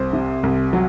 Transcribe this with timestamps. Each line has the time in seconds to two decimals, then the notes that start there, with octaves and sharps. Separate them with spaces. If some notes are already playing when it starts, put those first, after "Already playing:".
Already playing: C2 C5
0.13 C3
0.43 C2
0.73 F#3